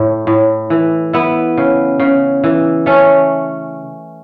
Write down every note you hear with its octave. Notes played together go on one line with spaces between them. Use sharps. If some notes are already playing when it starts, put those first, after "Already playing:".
Already playing: A2 A3
A2
E3
B3 E4
C#3
C#3
E3
A3 C#4